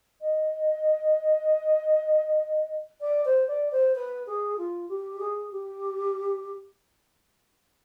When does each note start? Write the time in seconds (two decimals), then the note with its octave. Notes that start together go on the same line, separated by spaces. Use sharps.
0.21 D#5
3.00 D5
3.25 C5
3.47 D5
3.71 C5
3.95 B4
4.26 G#4
4.57 F4
4.88 G4
5.19 G#4
5.51 G4